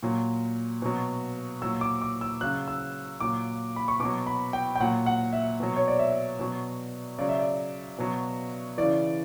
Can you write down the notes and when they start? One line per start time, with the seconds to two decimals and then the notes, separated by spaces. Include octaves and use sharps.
0.03 A#2 F#3
0.82 B2 F#3
1.62 F#3 E6
1.65 A#2
1.81 D6
2.02 D6
2.21 E6
2.41 C#3 F#3 F#6
2.68 E6
3.20 A#2 F#3 D6
3.76 B5
3.88 C#6
4.00 B2 D6
4.05 F#3
4.27 B5
4.53 G5
4.76 G5
4.80 A#2 F#3 F#5
5.06 F#5
5.33 E5
5.60 B2 F#3
5.76 C#5
5.88 D5
5.99 E5
6.39 B2 F#3
7.18 C#3 F#3 D5
7.29 E5
7.40 D5
7.98 B2 F#3
8.78 C#3 E3 D5